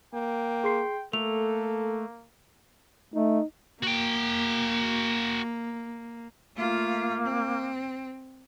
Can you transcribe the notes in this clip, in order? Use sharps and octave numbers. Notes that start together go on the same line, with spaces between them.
A#3 G5
G#4 C6 C7
A3 A#3 A4 F7
A3 D#4
A#3 F#4 G5
A3 A#3 F4
C4